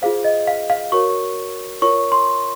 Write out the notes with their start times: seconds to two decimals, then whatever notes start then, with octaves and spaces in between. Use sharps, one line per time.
0.02 F4 G#4 C5 F5
0.24 D#5
0.47 F5
0.70 F5
0.92 F#4 A#4 C#5 C#6
1.82 F4 A#4 C#5 C#6
2.12 C6